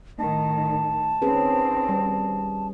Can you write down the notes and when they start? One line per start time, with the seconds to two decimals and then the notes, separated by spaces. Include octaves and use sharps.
0.19 A2 D#3 A5
1.22 D#3 C4 C#4 G#4 B4
1.89 G3